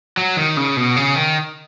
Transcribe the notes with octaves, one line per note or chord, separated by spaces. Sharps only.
F#3
D#3
C#3
B2
C#3
D#3